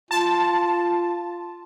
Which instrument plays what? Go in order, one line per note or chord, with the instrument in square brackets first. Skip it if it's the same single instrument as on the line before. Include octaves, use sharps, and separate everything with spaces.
[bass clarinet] F4 [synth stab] A5